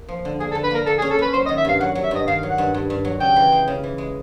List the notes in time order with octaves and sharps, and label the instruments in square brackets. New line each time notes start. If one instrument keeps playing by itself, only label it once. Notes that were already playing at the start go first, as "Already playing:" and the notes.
Already playing: [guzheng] A#3
F3
D3
[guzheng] A#3 [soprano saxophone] G#4
[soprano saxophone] A4
[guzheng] D3
[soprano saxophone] B4
[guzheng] A#3 [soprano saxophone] A#4
[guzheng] A#3 [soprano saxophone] A4
[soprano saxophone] G#4
[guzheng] C#4
[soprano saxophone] A4
[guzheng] C#4 [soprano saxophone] B4
[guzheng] F#3 [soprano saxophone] C5
[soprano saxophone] D#5
[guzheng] D#3
[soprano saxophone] E5
[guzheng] G2 [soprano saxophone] F5
[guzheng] F#3 [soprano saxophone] F#5
[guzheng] F#3
[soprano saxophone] E5
[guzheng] G2 [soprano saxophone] D#5
[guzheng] D#3 [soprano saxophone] F5
[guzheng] F#3
[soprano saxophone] F#5
[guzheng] G2
G2
G2
F#3
[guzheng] C#3 [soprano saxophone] G5
[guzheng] E3
G#3
C#3
E3
G#3